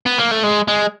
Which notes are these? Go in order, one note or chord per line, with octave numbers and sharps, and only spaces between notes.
B3
A#3
A3
G#3
G#3